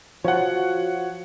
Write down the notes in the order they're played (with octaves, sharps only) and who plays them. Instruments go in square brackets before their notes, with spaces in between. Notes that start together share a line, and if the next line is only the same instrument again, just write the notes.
[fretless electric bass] F3 [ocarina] F#4 [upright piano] C#5 F#5